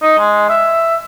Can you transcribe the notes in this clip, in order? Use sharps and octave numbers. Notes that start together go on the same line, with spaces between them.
D#4
G#3
E5